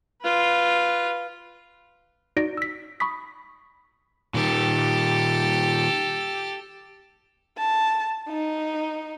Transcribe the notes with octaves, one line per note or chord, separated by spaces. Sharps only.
F4 B4
D#4 F#4 D5 A#6 D7
E6 B6
B5 C#6 D#6 B6
A#2 D#3 G4 A4
A5
D#4